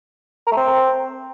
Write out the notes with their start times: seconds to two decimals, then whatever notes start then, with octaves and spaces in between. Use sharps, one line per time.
0.47 A#4
0.52 A3
0.57 C4